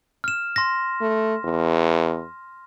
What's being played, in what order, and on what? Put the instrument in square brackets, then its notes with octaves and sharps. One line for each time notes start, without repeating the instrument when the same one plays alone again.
[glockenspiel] F6 E7
C6 A#6
[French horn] A3
E2